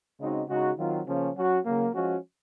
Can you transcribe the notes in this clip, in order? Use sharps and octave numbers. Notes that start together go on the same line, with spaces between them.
C#3 G#3 C4 D#4 F#4
C#3 G#3 D#4 F#4
D#3 F#3 C4 F4
C#3 F3 A#3 C#4
F#3 C#4 F#4
C#3 F#3 A#3
F3 G#3 C#4 F#4